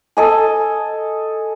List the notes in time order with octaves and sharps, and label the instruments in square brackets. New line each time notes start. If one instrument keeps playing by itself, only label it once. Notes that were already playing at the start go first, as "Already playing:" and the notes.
[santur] A4 D#5 G#5